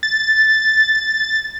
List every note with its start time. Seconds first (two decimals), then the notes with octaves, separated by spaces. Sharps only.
0.03 A6